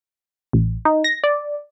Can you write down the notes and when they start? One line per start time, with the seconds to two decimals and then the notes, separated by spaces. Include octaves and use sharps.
0.53 A1
0.85 D#4
1.04 A#6
1.24 D5